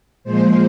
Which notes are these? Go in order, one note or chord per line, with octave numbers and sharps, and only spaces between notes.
A#2 F3 G#3 C5